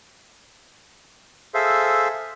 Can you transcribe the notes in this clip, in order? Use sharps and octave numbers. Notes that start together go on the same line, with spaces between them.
G#4 A4 C5 E5 F5